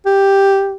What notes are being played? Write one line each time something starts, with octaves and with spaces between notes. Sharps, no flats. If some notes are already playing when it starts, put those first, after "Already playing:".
G4